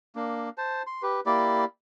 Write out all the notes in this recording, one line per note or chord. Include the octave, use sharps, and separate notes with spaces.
A#3 D4
C5 A5
C6
G4 B4
A#3 E4 G4 D5